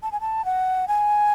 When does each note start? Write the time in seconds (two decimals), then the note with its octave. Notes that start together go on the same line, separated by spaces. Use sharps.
0.03 A5
0.12 G#5
0.21 A5
0.45 F#5
0.88 G#5